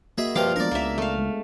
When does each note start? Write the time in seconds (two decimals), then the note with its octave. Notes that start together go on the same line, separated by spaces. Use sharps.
0.18 A#3 F#4 G#4 D#5 E5 B5
0.36 G2 C3 F3 F5 G5 D6
0.56 G#3 B3 D4 A#4 D5
0.72 C#2 A#3 E5
0.98 A3 F5
1.18 G#3